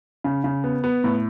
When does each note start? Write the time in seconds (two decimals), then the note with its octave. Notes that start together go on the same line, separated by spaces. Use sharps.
0.24 C#3
0.44 C#3
0.64 B3
0.84 B3
1.04 A2